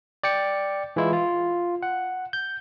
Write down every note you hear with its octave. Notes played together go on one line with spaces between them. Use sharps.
D5 G5 C#7
E3 G#3 E4 F4
F4
F#5
G6